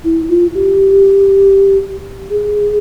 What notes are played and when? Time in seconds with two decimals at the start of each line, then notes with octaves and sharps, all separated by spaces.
0.04 E4
0.29 F4
0.54 G4
2.30 G#4